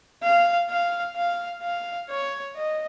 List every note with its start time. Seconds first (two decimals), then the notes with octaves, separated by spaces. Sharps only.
0.23 F5
0.70 F5
1.16 F5
1.63 F5
2.10 C#5
2.56 D#5